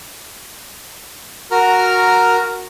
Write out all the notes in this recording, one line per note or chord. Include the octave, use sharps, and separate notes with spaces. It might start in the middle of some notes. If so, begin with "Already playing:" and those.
F#4 A#4 A#5 F6